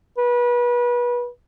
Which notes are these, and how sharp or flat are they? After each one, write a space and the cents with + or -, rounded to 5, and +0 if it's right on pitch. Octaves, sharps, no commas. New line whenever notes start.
B4 -30